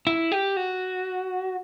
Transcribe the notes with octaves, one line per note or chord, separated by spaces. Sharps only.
E4
G4
F#4